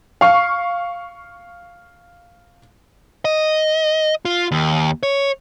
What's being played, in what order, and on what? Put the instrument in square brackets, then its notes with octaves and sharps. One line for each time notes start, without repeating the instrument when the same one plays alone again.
[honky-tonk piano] F5 C#6
[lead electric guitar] D#5
F4
D#2
C#5